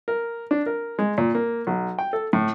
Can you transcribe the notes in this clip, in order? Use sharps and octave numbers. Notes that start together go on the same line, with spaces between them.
A#4
D4
A#4
G#3
A#2
A#3
B1
G5
A4
A2